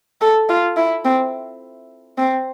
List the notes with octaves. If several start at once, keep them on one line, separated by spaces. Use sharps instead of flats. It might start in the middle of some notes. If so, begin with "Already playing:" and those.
A4
F4
E4
C4
C4